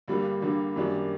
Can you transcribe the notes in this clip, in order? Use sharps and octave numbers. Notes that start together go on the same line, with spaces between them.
G2 D3 G3 A#3
G2 D3 G3 A#3
F#2 D#3 G3 A#3 D4